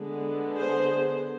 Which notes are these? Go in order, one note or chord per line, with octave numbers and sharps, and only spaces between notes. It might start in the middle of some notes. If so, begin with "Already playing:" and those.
Already playing: D3 G#3 B3
G#4 C5